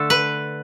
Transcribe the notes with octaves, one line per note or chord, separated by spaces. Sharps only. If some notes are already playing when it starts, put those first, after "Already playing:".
Already playing: D3 A3 A4
B4